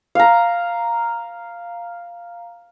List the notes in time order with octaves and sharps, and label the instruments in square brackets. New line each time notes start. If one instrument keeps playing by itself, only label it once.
[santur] F5 A#5